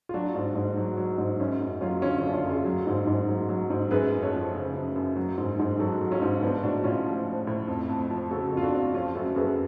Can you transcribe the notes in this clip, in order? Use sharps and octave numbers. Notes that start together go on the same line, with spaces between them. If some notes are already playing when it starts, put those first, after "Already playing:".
F4
F#3 D4 F#4
G#2
G#2
F#3
F#3
G#2
F#2 C#4
F#2
F#3 C#4 F4
D3 C#4 F4
C#4 F4
F#2 D4
C#4 F4
F#2
F4 G#4
F#3
G#2
G#2
F#3
F#3
G#2
F#2 G#4 B4
F#2
A4 C#5
F3
C#3
F#2
F#2
F#3
G#2
G#2
F#3 F#4 A4
F#3
C#4 F4
G#2
F3 B3 D4
A2 D4 F#4
A2 C#4 F4
F3
F3
A2
F2
F2
F3
C#3 F#4 A4
F2 F4
D4 F#4
F2
F3 C#4 F4
F#2 F#4 A4
F#2 G#4 B4